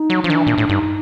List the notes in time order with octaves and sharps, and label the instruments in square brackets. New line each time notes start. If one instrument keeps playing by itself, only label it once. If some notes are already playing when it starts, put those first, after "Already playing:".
Already playing: [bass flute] D#4
[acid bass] F#3
[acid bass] F3 [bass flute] D4
[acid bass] D#3
E3
A#2
A2
[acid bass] G2 [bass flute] D#4